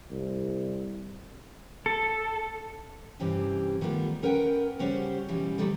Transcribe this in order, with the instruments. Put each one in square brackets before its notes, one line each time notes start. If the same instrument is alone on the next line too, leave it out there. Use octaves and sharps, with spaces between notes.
[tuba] C2
[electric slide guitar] A4
[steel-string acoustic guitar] G2 C3 E3 C4 C#4 G4
D#3 G3 A3 B3 F4
C#4 A#4 B4 F#5 G5
C#3 G3 C#4 F#4 G4 C5
B2 E3 G3 C#4 E4
D2 G2 D#3 F#3 G3 A3